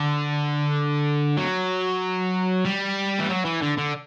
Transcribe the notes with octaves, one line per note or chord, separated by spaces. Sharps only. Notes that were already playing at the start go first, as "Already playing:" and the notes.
Already playing: D3
F#3
G3
E3
F#3
E3
D3
D3